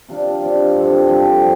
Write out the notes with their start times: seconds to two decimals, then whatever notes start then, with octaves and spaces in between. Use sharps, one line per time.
0.08 C3 F3 D4 F4
0.41 C3 F3 D4 F4
0.74 G2 F3 C4 A4
1.07 G2 F3 C4 A4
1.40 F3